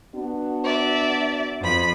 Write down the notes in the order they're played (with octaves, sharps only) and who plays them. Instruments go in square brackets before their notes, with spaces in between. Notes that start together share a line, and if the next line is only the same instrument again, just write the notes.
[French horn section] B3 D4 F#4
[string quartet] D5 E5
F2 B5